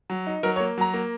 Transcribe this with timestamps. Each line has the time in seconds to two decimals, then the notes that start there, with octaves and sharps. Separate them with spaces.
0.10 F#3
0.27 D#4
0.43 F#3 A#4
0.56 C#5
0.60 A#3
0.78 F#3 A#5
0.94 A#3